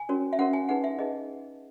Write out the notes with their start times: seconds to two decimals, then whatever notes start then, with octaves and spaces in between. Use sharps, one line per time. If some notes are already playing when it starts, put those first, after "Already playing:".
Already playing: G#5
0.09 C#4 F#4 A#4 C#5
0.33 E5
0.39 C#4 F#4 A#4 C#5 F#5
0.53 G#5
0.69 D#4 G#4 B4 F#5
0.84 E5
0.99 D#4 G#4 B4 D#5